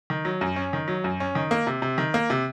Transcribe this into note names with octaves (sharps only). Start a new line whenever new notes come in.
D#3
F#3
F#2
C#4
D#3
F#3
F#2
C#4
D#3
A#3
C3
C3
D#3
A#3
C3